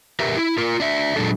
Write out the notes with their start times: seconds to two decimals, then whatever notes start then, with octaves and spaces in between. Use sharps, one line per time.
0.20 G4 A#4 B4 E5
0.37 E4
0.58 F4 A#4
0.80 D4 E5
1.16 A#2 F#3 G#3 D4 A4